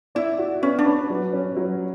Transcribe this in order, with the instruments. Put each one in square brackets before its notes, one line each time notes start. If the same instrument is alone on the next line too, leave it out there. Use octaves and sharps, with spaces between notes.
[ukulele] E4 [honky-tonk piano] D5
[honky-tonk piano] F#4
[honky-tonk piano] B3 [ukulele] C#4
[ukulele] D4
[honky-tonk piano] B4
F#3
C#4
F#3